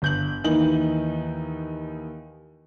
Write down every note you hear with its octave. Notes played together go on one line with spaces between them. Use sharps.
G1 G6 F#7
D#2 E3 D#4 F#7